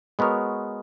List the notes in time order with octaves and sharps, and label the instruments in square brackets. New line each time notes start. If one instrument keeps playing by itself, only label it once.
[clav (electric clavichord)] G#3 B3 F#4 A#4 C#5